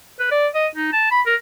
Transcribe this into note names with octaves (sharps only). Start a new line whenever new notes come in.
B4
D5
D#5
D#4
A5
B5
A#4